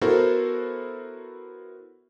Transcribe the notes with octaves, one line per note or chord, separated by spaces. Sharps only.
B3 E4 F#4 A4 A#4 C5